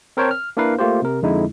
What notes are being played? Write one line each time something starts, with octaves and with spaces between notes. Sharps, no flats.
C4 A#4 C5 C#5 G5 A5
F6
A#3 D4 E4 A#4 B4 F5
A3 A#3 F4 G4 C5
C3 A#4
F2 D3 G#3 D#4 E4